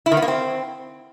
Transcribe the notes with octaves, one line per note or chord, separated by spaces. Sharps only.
E4
D#3
B3
A#3
C4